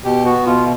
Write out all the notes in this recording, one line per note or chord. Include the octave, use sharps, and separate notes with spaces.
B2 G4
B3 F#4
B2 F4